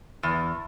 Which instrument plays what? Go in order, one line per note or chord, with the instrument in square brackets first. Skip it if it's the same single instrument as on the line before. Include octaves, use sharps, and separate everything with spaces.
[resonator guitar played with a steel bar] E2